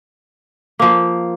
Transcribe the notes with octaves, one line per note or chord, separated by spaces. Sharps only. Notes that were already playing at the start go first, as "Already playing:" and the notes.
F3 A#3